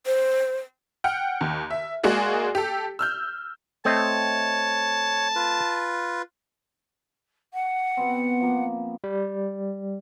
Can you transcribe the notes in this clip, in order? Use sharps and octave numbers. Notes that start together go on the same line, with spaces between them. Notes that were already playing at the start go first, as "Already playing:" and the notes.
C5
F#5 G5 F6
D#2
E5
G#3 A#3 F#4 G#4 D5
G4 A4
E6 F6 G6
A3 C4 C#5 D#5 A5
F4 B4
F#5
B2 B3 C4
F3 A#3
G3